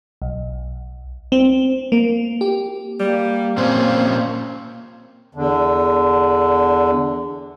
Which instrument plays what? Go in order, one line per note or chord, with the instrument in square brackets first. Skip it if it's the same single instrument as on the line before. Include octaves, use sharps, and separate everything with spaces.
[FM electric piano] B1
C4
A#3
G4
[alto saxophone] G3 [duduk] A#3
[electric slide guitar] A#2 C#4 C5 [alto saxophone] C4
[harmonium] E2 D3